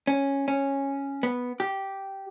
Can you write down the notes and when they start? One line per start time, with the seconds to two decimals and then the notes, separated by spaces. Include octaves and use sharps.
0.07 C#4
0.48 C#4
1.23 B3
1.60 G4